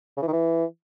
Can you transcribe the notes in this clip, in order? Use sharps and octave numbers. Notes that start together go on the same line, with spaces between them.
C#3
E3
D#3
E3